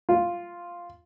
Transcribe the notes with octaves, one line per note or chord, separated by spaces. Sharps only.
F4